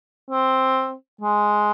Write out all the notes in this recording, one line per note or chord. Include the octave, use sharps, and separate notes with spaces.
C4
G#3